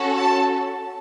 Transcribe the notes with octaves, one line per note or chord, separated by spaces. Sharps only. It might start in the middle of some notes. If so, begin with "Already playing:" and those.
Already playing: C#4 F#4 A4
A5